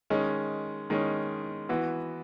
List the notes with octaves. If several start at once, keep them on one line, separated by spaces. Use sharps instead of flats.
D#3 G#3 C#4
D#3 G#3 C#4
E3 B3 F#4